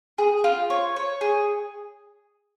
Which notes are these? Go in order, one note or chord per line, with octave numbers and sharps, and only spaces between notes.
G#4
F4
C#5
C#5
G#4